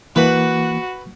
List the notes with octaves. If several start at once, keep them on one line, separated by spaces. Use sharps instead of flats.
E3 A#3 F#4 B4